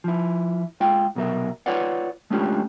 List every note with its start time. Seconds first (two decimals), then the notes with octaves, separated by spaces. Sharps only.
0.04 F3 E4
0.80 G#3 F4 F5 G5
1.15 C2 B2 F#3 A#4 E5
1.66 F4 B4 C#5 D5 F#5
2.30 G#3 A3 C#4 D4 F4 G4